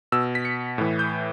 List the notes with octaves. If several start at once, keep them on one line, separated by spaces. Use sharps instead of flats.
B2 E6
B6
C#7
A2 E3
G6